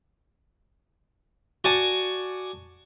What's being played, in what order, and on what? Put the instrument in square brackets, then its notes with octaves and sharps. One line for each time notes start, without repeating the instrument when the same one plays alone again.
[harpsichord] F#4 D5 G#5 A5 C#6 D6